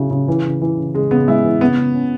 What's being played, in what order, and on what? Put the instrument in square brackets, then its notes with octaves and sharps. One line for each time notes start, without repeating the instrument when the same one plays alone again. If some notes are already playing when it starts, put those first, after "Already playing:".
Already playing: [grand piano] C#3 F#3 E4
C#3
E3
C#3
E3
C#3
[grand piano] C#3 [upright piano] G#3
[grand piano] C#3 [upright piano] B3
[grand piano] G#3 [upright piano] E4
[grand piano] E3
[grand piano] C#3 [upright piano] B3
[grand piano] C#3
C#4